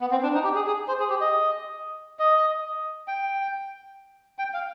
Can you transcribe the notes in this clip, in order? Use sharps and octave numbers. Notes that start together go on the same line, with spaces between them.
B3
C4
D4
D#4
G4
G#4
G#4
C5
G#4
G4
D#5
D#5
G5
G5
F5